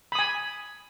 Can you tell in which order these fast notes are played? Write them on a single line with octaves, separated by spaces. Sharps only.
B5 D#6 G#5